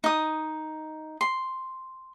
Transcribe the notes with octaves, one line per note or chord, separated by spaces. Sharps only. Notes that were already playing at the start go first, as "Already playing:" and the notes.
D#4 D#6
C6